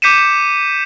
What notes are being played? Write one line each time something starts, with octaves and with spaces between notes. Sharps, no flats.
D6 G6 B6 C#7 D#7 E7